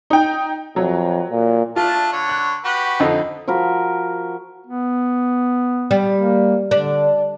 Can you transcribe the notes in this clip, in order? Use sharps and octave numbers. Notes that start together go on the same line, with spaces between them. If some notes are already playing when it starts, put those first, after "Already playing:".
D#4 G5
F2 F#3
A#2
A3 D4 F4 A5
D3 C#5
F#6
F#4 G4 B4
F2 D3 D#4
F3 F#4 A#4 B5
B3
G3
A#3
D3 D4